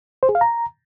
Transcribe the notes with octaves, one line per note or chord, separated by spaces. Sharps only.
C5
G#4
F5
A#5